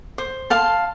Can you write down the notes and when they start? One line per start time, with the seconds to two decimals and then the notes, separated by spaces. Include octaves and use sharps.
0.18 C5
0.50 F5 A5 C6